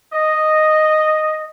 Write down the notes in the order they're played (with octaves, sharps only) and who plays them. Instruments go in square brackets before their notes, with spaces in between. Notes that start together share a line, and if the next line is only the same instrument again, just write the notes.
[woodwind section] D#5